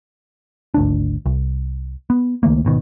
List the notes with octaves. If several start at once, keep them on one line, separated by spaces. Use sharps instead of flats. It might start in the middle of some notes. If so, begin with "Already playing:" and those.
G#1 D2 D4
C2
B3
C#2 D#3 A3 A#3
G#1 B2 D#3